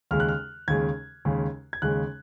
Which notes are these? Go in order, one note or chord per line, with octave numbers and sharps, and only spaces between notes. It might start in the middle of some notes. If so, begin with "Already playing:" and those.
D#2 C#3 G#3 F6
F#6
F6
D#2 C#3 G#3 G#6
D#2 C#3 G#3
G#6
D#2 C#3 G#3 F#6